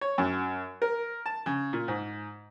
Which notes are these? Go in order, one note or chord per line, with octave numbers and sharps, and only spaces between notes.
C#5
F#2
A#4
A5
C#3
A#2
G#2